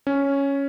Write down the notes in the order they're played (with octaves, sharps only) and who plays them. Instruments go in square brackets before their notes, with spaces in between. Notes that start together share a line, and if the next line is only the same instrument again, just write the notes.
[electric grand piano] C#4